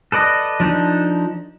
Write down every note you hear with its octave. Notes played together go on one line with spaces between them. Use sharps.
A4 B4 D5 D#5
F3 D4 D#4 A4